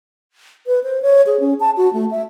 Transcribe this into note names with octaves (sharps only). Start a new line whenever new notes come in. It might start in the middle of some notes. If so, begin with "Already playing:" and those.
B4
C5
C#5
G#4
C#4
A5
F#4
A3
E5